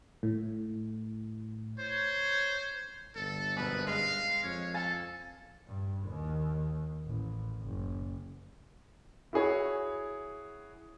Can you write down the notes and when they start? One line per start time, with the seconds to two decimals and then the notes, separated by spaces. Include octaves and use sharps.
0.23 A2
1.79 C5 C#5
3.16 G1 A4
3.57 F#1 B2 B4
3.87 G#3 F5
4.43 F2 C#5
4.74 A4 F5 G#5 A6
5.68 G2
6.08 D#2
7.06 A1
7.62 F#1
9.33 E4 F#4 G#4 C#5